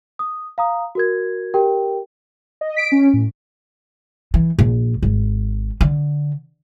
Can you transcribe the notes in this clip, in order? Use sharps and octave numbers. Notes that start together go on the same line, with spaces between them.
D#6
F5 A#5 D#6
F#4 A#4 G#6
G4 A#4 G5
D#5
B6 D7
C#4
A2
E3
A#1
G#1
D3